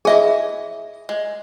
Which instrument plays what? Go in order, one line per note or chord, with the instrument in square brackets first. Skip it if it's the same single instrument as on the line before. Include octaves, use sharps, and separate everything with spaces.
[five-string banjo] E4 D#5 G#5 [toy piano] G#4 E5
[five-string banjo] G#3